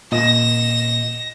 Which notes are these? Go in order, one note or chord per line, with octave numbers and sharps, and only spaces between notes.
A#2 D#5 A#6 E7